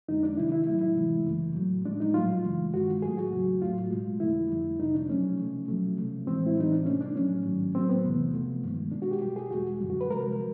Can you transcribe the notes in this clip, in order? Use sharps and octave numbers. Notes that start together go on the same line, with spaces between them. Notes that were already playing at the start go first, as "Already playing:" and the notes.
F2 D3 F3 G#3 D#4
D4
C3 D#3 G3 E4
E4
A2 F#3 A3 E4
E4
C3 E3 G#3
F#2 C#3 E3 A3
A2 F#3 A3
A2 F3 G#3 D4
D#4
A#2 F#3 A3 F4
F#2 C#3 E3 G#3
G2 D#3 G#3 F#4
A2 F#3 A3 G#4
F#4
E2 C#3 F#3
A2 F#3 A3 F4
B2 G#3
F2 D3 F3 A3 E4
F2 D3 G3
F2 C3 F3 D#4
D4
B2 F#3 A3 C#4
C3 F3 A3
B2 F#3 A3
C3 F3 A3
A2 E3 G#3 C4
E4
A2 E3 G3 D#4
D4
C3 F3 A3 C#4
D4
A2 F#3 A3 C#4
G#2 D#3 F#3 A3
A2 F#3 A3 C4
B3
E2 C3 E3 A3
C3 F3 A3
G2 D#3 G#3
B2 G#3 D4
F#4
G4
B2 G3 G4
G#4
E2 B2 G#3 F#4
F#2 D3 G3
F#4
B4
C3 F3 G#3 A#4